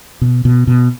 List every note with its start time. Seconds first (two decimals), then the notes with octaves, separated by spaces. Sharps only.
0.21 B2
0.45 B2
0.67 B2